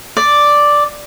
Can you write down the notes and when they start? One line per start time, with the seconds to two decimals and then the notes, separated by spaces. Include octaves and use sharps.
0.17 D5